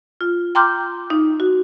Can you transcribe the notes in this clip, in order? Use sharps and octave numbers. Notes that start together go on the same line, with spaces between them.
F4
G5 A#5 C6 D6 F6 G6
D#4
F#4